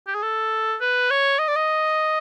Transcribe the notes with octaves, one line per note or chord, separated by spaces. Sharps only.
G4
G#4
A4
B4
C#5
D#5
D5
D#5